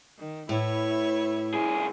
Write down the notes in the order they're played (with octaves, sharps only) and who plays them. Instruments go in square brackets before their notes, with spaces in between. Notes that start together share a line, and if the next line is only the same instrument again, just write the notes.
[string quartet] D#3
[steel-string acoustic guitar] A2 [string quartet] E4 B4 C#5
[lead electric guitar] C2 G#4